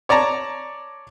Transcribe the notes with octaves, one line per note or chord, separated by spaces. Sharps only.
C#5 D5 A5 A#5